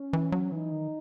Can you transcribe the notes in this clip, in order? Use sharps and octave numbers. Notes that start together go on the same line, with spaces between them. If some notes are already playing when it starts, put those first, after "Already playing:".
Already playing: C#4
E3
F#3
E3 D#4
D#3